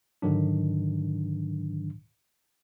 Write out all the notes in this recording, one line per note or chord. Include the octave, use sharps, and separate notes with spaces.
G#2 D3 D#3 F#3 D4